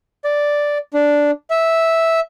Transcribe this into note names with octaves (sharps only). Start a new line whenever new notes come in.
D5
D4
E5